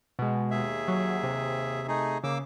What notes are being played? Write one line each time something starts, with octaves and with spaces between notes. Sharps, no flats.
B2 G#3
D#2 G#4 E5
F#3
C3
A3 D#4 G#4
C#3 A#3 D6 E6